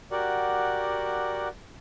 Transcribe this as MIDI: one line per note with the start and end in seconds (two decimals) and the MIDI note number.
0.11 1.48 66
0.11 1.48 67
0.11 1.48 70
0.11 1.48 74
0.11 1.48 78